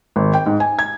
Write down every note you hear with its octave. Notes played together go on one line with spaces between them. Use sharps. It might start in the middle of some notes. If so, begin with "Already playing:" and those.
G#1
G5
G#2
G#5
G#6